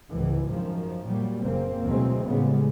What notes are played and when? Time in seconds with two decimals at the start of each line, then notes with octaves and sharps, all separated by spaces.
0.12 G#1 C#2 G#2 E3
0.50 F#2 D#3 F3
1.07 A#2 F#3 G3
1.40 F#1 A#3 C4
1.83 D2 B2 E3 F#3 G#3 C4
2.24 A2 C#3 G3 G#3 B3